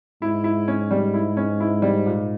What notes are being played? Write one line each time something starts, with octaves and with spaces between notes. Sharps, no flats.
G#2 E4
E4
C#4
G3
E4
C#4
E4
G3
A#2